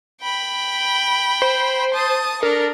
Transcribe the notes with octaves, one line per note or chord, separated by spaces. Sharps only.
G5 B5
C5
A5 D#6
D4 A4 A#4